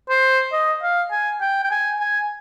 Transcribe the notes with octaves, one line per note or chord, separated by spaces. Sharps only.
C5
D#5
F5
G#5
G5
G5
G#5
G#5